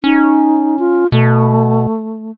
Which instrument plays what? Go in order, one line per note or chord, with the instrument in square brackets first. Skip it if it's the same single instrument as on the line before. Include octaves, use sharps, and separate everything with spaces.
[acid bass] C#4 [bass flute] D#4
[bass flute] F4
[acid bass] B2 [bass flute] A3